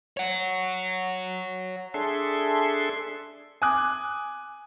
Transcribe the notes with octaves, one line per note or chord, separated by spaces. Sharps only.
C#5 F#5
D4 G#4 A4 E5 C6
G#5 D6 D#6 F#6